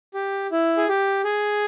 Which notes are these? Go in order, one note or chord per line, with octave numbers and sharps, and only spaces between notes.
G4
E4
G#4
G4
G#4